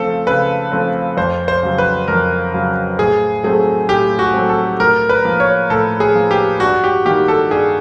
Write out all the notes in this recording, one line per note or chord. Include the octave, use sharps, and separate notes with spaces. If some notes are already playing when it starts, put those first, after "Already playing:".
Already playing: C#3 F3 A3 C4 A4
C#3 B4
F3 A3 C4
F2 C5
C5
C#3 F#3
B4
F2 A#4
C#3 F#3
A2 G#4
F#3 A3 C4 G#4
A2 G4
F#4
F#3 A3 C4
A4
A2 A#4
B4
F3 A#3
C#5
A2 A4
G#4
F3 A#3
G4
G2 F#4
G4
D#3 G3 A#3 G4
A4
G2 G#4